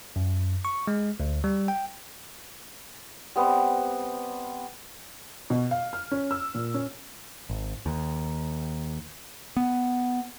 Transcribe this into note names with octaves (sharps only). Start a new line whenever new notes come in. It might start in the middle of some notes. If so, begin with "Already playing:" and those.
F#2
C#6
G#3
D2
G3
G5
G3 B3 C4
B2
F5
F6
C#4
E6
A#2
C#4
G#1
D#2
B3